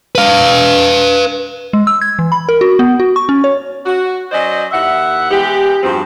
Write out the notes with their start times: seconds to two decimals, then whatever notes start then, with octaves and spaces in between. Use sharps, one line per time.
0.15 B4 F5
1.73 G#3
1.87 E6
2.02 G#6
2.19 E3
2.32 B5
2.49 A#4
2.61 F#4
2.79 B3
3.00 F#4
3.16 C#6
3.29 C#4
3.44 C#5
3.86 F#4
4.32 F#3 C#4 C5 D5 D#5
4.72 D#2 E4 E5 F#5
5.31 E3 G#3 B3 G4
5.83 E2 G2 F3 C4 F#4 C5